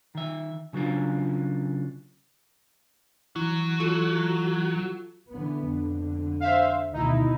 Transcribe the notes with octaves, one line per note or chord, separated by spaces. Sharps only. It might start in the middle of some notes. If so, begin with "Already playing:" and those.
D#3 E5
C#3 F#3 D4 F4
E3 F#3
F4 F#4 A4
D3 E3 B3
F2 D3
C5 E5 F5
D2 B2 D#3 D#4 E4